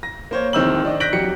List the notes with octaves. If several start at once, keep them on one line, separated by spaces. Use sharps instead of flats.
A#6
A#3 C5 C#5
D1 D#3 C4 E6 G6 F#7
D4 D#5
F#6 G6 A#6 B6 D7 F#7
F#3 G4 C#7